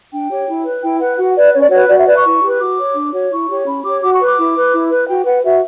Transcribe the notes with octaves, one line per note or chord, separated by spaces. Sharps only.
D4 G5
G4 C#5
E4
B4
E4 G5
B4 F#5
F#4 F#5
B4 D5
C#4 C#5
D5
F#4 B4 C#5
F#4 D5
E5
B4 D5
C#6
E4
G4 B4
F#4 D6
C#5
D4
F#4 C#5
E4 C#6
G4 C#5
C#4 B5
G4 C#5 D6
F#4 D6
C#6
B4
D6
E4
B4
E4
B4
F#4 G5
B4 F#5
F#4 E5